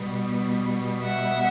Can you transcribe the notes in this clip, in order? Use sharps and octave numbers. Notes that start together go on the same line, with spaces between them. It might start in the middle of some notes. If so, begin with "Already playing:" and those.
Already playing: B2 G3 B3
E5 F#5